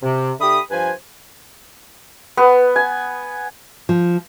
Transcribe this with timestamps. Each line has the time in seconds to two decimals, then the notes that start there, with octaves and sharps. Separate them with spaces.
0.02 C3
0.40 D3 G4 E5 B5 D#6
0.71 G2 F3 B4 C5 G#5
2.37 B3
2.76 G#5
3.89 F3